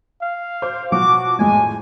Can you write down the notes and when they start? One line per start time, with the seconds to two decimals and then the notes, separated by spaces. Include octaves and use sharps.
0.22 F5
0.62 C5 D6
0.92 B2 F3 F#3 F#4 D6
1.39 G#1 F2 A2 G#3 G#5